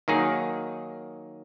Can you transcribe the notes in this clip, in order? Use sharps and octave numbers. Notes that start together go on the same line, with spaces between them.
D#3 F#3 A#3 D#4 G#4